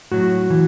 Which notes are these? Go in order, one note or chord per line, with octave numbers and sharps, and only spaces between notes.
A2 F#3 F#4
E3